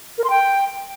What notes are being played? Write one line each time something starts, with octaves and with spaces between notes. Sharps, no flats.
A#4
C6
G5